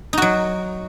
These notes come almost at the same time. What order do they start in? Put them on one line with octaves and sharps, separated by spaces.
D#4 F#4 F#3